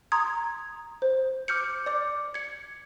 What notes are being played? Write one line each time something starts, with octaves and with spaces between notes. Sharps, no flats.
A#5 C6 D#6 G#6
C5
D6 F6 G6 C#7
D5 D6
G#6 C#7